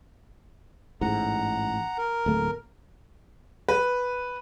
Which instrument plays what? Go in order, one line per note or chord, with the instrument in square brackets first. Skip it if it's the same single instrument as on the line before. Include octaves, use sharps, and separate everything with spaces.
[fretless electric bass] A1 G#2 [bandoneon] F#5 A#5
[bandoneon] A#4
[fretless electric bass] D1 A3 A#3
[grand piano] B4